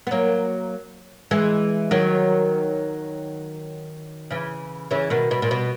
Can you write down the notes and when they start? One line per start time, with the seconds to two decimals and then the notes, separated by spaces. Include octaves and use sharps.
0.07 B3
0.11 F#3 A#3
1.31 E3 G#3
1.91 D#3 F#3
4.31 C#3 E3
4.91 C#3 E3
5.10 B2 D#3
5.31 B2
5.42 A#2
5.51 B2